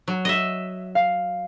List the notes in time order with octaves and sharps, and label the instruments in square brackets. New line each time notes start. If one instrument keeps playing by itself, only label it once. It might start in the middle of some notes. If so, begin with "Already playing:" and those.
[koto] F#3
D#5 E5
[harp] F5